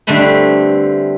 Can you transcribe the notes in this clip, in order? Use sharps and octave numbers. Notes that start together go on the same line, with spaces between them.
D3 G3 A3 C4 B4